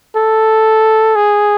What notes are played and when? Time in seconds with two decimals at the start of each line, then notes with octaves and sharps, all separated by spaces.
0.16 A4
1.16 G#4